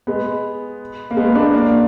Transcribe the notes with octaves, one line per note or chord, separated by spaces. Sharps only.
G#3 B3
A#3
G#3 B3
A#3 D4
A#3 D4